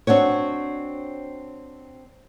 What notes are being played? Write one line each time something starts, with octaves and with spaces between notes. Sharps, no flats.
C4 D4 F#4 C#5